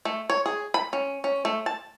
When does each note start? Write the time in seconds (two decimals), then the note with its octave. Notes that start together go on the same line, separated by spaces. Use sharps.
0.05 A3
0.30 C#5
0.46 G#4
0.74 B5
0.93 C#4
1.24 C#4
1.45 A3
1.66 A5